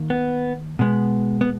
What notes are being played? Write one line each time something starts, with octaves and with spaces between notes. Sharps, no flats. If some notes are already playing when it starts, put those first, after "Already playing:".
Already playing: D#3 A#3
B3
B2 G#3 B3
B3